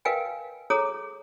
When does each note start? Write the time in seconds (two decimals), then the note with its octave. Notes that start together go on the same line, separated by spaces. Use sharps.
0.05 A#4 B4 D#5 F5 G5 G#5
0.70 G#4 A4 C#5 A#5 D#6